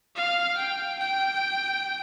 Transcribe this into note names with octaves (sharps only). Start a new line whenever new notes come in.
F5
G5
G5